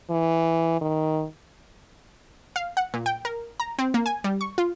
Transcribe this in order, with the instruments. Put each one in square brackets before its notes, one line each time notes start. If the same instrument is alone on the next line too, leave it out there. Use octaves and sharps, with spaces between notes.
[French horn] E3
D#3
[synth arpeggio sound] F5
F#5
A#2
G5
A#4
A#5
C4
A#3
G#5
G3
C#6
F4